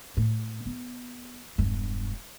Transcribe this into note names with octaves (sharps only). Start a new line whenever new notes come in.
A2
B3
E1 G2